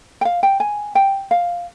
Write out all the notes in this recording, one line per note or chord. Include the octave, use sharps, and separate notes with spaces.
G5
F5
G5
G#5
G5
F5